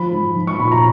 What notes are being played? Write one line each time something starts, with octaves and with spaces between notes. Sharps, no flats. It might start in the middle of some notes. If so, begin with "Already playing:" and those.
Already playing: F3 B5
G#2
F3
C#6
A#2 B5
A#5